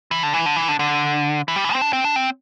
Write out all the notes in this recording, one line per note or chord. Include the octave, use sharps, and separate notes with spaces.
E3
D3
E3
D3
E3
D3
D3
E3
G3
E3
C4
D4
C4
D4
C4